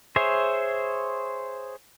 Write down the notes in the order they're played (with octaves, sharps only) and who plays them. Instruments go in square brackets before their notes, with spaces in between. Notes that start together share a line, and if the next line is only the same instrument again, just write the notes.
[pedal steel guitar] G#4 C5 C#5 E5